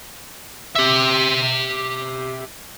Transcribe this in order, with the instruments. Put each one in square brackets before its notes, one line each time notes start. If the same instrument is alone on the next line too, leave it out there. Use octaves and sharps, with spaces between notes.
[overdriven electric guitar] G4 E5